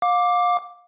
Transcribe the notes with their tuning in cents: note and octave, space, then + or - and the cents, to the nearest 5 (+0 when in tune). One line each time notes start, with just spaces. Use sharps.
F5 +30 D6 +0